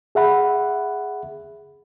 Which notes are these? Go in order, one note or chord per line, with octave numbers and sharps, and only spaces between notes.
G#4 E5 F#5 B5